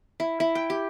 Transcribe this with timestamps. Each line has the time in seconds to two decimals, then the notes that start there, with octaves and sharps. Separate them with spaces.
0.20 E4
0.40 E4
0.55 G5
0.70 G4